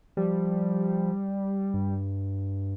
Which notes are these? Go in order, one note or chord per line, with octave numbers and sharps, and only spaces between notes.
F3 G3
G2